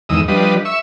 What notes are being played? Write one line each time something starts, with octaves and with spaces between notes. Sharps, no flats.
E2 G#2 D#3 D#6 E6
F3 G3 D4 B4 D#5
E5 C#6 E6